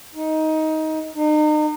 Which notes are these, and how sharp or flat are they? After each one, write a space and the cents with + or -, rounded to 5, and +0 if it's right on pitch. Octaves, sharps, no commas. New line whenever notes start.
D#4 +15
D#4 -35